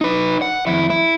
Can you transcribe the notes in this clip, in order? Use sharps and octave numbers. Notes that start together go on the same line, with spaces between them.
D#4 B4
F#5
F2 E4
E4